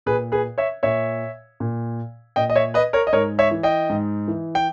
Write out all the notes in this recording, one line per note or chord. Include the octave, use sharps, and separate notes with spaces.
A#2 G#4 B4
G#4 B4
C#5 E5
A#2 C#5 E5
A#2
A#2 D#5 G5
D#5
C#5 E5
B4 D#5
A#4 C#5
D#5
G#2 A#4 C#5
C#5 E5
E3
D#5 G5
G#2
E3
G5